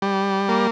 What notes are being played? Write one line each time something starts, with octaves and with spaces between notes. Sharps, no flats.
G3
A#3